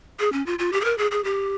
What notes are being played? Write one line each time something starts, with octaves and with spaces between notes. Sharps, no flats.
G#4
C#4
F4
F4
G4
G#4
A#4
G#4
G#4
G4